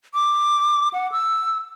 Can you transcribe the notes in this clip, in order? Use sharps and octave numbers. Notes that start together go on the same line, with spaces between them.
D6
F#5
E6